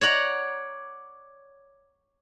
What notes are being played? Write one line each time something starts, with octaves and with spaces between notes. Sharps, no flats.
C#5 D5 F#5 A#5